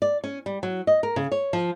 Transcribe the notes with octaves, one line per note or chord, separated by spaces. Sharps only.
D5
C#4
G3
F#3
D#5
A#4
C#3
C#5
F3